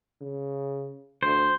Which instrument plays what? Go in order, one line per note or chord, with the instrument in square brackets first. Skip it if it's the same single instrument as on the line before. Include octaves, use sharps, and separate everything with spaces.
[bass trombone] C#3
[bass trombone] D2 [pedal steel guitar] C5